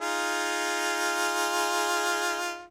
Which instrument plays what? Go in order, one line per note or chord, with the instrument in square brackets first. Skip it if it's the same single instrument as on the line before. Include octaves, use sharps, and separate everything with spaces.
[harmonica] D#4 F4 G#4